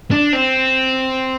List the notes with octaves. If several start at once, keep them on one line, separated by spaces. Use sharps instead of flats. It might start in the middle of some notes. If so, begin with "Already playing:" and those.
D4
C4